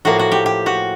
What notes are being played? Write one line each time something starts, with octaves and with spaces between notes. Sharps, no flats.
A2 F3 A#3 F#4
F#4
G4
G4
F#4